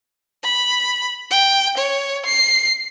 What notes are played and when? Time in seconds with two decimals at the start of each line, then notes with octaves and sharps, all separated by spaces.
0.44 B5
1.30 G5
1.77 C#5
2.26 C7